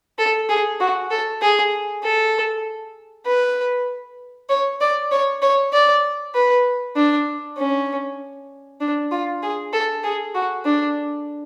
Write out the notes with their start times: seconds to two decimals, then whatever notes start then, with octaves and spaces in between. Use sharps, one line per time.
0.18 A4
0.49 G#4
0.80 F#4
1.11 A4
1.42 G#4
2.03 A4
3.26 B4
4.49 C#5
4.81 D5
5.11 C#5
5.42 C#5
5.73 D5
6.35 B4
6.96 D4
7.58 C#4
8.81 D4
9.11 F4
9.43 G#4
9.73 A4
10.04 G#4
10.35 F#4
10.65 D4